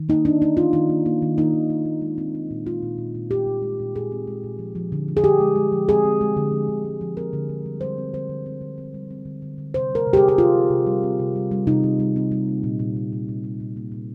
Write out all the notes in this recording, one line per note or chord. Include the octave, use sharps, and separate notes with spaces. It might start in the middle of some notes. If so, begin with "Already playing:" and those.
Already playing: D#3
A#3 D#4
A#3 D4
A#3 D#4
D#3 F4
D#3 D#4
A#3
A#3
D#3
A#3 D#4
D#3
A#3
A#3
G#3
C4
C4
A#2
G#3 F4
A#2
A#2
A#2
A#2 G4
A#2
G#3
A#2
A#2 G#4
C4
G#3
A#2
F3
F3
D3
F3
G#4
D3 G4
G#3
G#3
F3
C4 G#4
C4
G#3
D3
F3
D3
G#3
F3
C4 A#4
D3
D3
G3
G3 C5
C4
D3 C5
D3
C4
D3
C4
G3
C4
D3
D3
D3
C3 C5
G3
A#4
C3
G4
G#4
C4
G4
C3 F4
C3
C3
G3
C4
C3
G3
G3
C3 D#4
G3
G3
C4
G3
A#3
A#2
A#2
A#2
A#2
A#2
G3
A#2
A#3
A#2